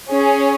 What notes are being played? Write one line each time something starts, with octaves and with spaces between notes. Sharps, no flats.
C#4 G#4